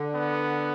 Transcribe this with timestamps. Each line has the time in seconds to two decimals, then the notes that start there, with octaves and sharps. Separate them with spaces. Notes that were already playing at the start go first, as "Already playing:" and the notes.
Already playing: D3
0.13 B3